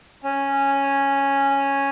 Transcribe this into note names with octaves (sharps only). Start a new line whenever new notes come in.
C#4